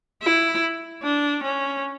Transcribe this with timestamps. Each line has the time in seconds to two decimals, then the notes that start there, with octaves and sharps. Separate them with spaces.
0.23 E4
1.03 D4
1.43 C#4